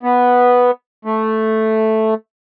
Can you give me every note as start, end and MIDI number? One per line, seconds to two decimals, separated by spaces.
0.03 0.71 59
1.05 2.14 57